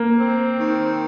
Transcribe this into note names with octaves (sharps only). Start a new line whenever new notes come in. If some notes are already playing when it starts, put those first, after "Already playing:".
Already playing: A#3
C4
D#3